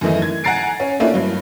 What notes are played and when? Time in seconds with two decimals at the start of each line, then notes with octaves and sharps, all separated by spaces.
0.01 F#2 D#3 E3 A3 D#4
0.22 G#6
0.44 F#5 G#5 A#5 A6 C7 D7
0.80 C#4
1.00 A3 A#3 C#4 D4 E4 F4
1.14 G2 F#3